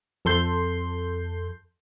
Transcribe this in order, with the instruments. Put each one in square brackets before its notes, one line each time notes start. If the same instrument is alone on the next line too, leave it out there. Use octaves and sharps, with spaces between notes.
[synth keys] F2 A4 C6 G6